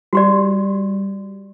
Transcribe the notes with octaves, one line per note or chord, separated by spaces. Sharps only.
G3 F#4 G4 D5